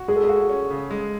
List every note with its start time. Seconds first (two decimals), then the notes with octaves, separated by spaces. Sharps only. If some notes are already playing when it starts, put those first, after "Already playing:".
Already playing: F#4
0.08 G#3 G#4
0.16 A4
0.23 G#4
0.29 F#4
0.49 C#4
0.71 C#3
0.91 G#3